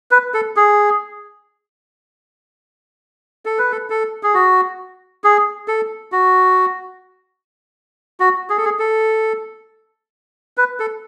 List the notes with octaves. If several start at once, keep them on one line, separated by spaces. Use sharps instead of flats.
B4
A4
G#4
A4
B4
A4
A4
G#4
F#4
G#4
A4
F#4
F#4
G#4
A4
G#4
A4
B4
A4